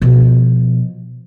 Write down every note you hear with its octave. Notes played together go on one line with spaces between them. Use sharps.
B2 F3